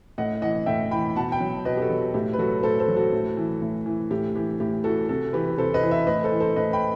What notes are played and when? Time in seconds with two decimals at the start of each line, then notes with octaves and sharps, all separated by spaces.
0.18 A2 D#5 F#5
0.42 E3 D#5 F#5
0.66 A2 E5 G5
0.91 E3 G5 B5
1.16 B2 F#5 A5
1.32 G5 B5
1.40 F#3
1.65 B2 B4 D#5
1.77 G4
1.82 F#4 A4
1.90 F#3
2.14 A2 G4
2.33 B4
2.38 F#3 F#4 A4
2.63 A2 A4 C5
2.79 A4 C5
2.88 F#3
2.96 F#4 A4
3.12 A2
3.37 E3
3.62 A2
3.86 E3
4.11 A2 G4
4.35 E3 G4
4.60 A2 G4
4.84 E3 F#4 A4
5.09 C3 F#4 A4
5.33 E3 G4 B4
5.58 C3 A4 C5
5.74 B4 D#5
5.83 E3
5.91 C5 E5
6.07 A2 B4 D#5
6.24 A4 C5
6.32 E3
6.40 A4 C5
6.56 A2 B4 D#5
6.73 G5 B5